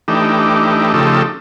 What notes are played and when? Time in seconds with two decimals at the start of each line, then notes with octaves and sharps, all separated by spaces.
0.08 E3 A3 D4 D#4 G4
0.94 C#3 F3 A3 D#4 G4 A4